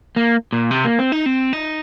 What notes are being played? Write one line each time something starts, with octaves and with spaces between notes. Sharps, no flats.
A#3
A#2
C3
A#3
C4
D#4
C4
D#4